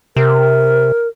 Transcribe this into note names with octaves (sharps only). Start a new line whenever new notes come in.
C3 A#4